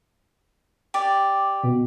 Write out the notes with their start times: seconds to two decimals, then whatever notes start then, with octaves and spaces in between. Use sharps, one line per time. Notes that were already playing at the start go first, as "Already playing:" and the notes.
0.94 G4 D5
1.63 B2